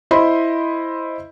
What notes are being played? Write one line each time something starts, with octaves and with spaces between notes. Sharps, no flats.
E4 C5 D#5 B5 C6